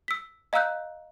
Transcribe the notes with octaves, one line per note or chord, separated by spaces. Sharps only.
E6 B6
D#5 F5 A#5 E6 F#6 G6